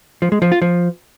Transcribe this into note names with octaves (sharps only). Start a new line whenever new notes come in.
F3
G#3
F3
F4
F3